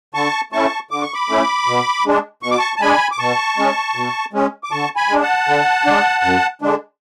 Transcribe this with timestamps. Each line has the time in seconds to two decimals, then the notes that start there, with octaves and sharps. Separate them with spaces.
0.14 D3 A5 C#6
0.52 A3 C#4 E4 A5 C#6
0.91 D3 D6
1.02 C#6
1.14 B5 D6
1.29 A3 C#4 E4
1.67 B2
2.05 G#3 D4
2.43 B2 C#6
2.51 D6
2.58 A5 C#6
2.76 A5
2.81 G#3 D4 G#5 B5
3.12 D6
3.18 B2 A5 C#6
3.57 G#3 C#4
3.95 B2
4.33 G#3 C#4
4.64 D6
4.71 D3 A5 C#6
4.96 G#5 B5
5.09 G#3 D4
5.22 F#5 A5
5.48 D3
5.85 G#3 D4
6.23 F#2
6.62 D3 G#3 D4